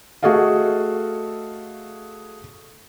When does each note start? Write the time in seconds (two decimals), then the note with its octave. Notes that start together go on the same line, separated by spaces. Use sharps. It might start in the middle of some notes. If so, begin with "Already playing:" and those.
0.23 A3 F#4 G#4 A4 D#5 F5